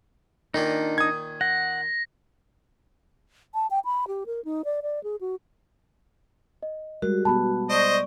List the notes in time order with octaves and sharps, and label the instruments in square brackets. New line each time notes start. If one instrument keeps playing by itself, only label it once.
[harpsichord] A#2 D#3 A#3 [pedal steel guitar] D4 D#4
[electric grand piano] D#6 G#6
[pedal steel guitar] F#5 [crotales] A#6
[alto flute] A5
G5
B5
G4
A#4
D#4
D5
D5
G#4
F#4
[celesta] D#5
[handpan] G3 G#3 [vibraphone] F#4 [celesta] A#4
[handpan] B2 B3 [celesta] A5 B5
[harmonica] C5 D#5 [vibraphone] D5 C#6